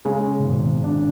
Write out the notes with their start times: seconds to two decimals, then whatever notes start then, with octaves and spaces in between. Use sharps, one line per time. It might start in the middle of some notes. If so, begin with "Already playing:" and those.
0.05 C#3 G#3
0.39 A2
0.44 G#1 B2
0.83 C#3 D4